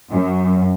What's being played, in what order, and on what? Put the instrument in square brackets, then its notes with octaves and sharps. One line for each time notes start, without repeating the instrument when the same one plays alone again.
[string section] F#2